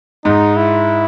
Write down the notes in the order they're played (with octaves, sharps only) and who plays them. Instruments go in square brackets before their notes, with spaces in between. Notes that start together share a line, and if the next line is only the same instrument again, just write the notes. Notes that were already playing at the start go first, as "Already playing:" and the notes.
[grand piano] G#2 [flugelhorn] D#4
[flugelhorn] E4